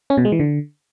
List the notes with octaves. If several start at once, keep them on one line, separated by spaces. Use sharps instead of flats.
C#4
B2
G#3
E3
D3